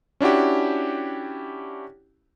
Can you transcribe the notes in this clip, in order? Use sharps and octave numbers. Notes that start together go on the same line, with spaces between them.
C#4 D4 E4 F#4 G4